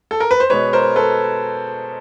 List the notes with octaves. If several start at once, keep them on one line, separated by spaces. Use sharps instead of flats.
A4
A#4
B4
C5
B2 G#3 B4 C#5
A#4 C5
A4 B4